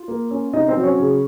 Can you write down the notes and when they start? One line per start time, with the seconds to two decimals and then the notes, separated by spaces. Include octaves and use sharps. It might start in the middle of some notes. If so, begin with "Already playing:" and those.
Already playing: F4
0.08 A#3
0.31 C#4
0.53 C3 D#4 D#5
0.68 C4 C5
0.76 F#3
0.83 C#4 C#5
0.99 C#3